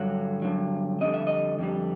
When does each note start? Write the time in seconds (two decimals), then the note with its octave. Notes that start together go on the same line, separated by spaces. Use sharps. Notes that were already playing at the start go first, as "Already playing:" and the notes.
Already playing: G2 D3 F#3
0.42 G2 D3 F#3
1.01 F2 D3 G3 D#5
1.14 E5
1.27 D#5
1.59 F2 D3 G3